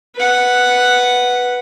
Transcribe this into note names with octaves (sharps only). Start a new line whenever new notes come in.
B4 F#5